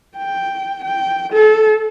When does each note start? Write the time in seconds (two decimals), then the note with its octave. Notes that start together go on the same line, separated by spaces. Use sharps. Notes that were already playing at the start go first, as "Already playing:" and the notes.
0.18 G5
0.85 G5
1.33 A4